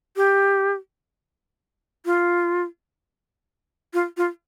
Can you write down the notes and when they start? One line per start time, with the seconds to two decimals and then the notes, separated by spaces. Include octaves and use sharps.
0.16 G4
2.06 F4
3.94 F4
4.17 F4